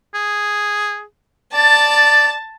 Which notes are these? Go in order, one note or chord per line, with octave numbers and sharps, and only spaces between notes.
G#4
D5 A5 A6